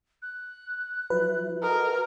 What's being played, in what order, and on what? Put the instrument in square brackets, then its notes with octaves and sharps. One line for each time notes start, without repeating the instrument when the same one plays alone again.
[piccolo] F#6
[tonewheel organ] F3 F#3 E4 [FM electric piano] B4
[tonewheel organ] F#4 A4 D#5 [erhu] A#4